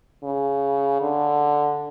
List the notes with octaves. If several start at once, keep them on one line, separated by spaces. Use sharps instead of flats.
C#3
D3